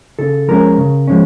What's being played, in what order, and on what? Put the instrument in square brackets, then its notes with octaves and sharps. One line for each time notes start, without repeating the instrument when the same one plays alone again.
[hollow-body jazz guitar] C#3 A4
F3 G#3 C#4 A#4
C#3
F3 G#3 C#4